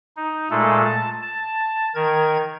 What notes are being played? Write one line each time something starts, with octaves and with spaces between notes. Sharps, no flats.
D#4
A#2 G#3 A3 A4
A5
A5
D#3 A#4 G#6